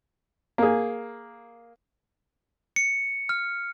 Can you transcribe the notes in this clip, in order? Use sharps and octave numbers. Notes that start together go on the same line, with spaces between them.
A#3 G#4
C#7
F6